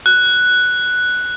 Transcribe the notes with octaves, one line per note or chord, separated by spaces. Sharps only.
F#6